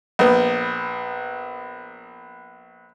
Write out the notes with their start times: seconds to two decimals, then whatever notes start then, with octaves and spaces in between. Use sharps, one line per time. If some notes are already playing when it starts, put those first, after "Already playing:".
0.19 A#1 B3